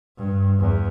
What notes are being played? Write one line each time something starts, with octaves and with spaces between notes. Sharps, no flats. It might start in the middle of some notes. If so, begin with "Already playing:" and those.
G2
E2